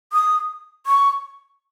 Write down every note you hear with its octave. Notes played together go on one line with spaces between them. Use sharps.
D#6
C#6